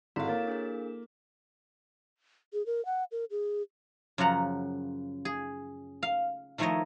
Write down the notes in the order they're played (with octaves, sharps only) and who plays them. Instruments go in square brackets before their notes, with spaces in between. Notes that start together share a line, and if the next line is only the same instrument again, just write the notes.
[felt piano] G#1 [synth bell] E4 A4 [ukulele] F#4 F5
[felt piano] A#3 [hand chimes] A#4 C#5 A6
[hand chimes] D4 G#4 A#4
[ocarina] G#4
A#4
F#5
A#4
G#4
[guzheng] F#2 C#3 F3 F#5 A#5
G#4
F5
D#3 F3 A3 E4 C#5 D#5